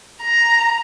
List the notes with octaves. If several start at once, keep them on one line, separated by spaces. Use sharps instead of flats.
A#5